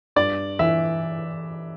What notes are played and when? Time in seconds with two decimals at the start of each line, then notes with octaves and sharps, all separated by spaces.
0.16 G2 D5
0.59 E3 E5